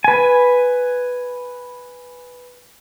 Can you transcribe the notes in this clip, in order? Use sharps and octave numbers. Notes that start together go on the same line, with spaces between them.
B4 G#5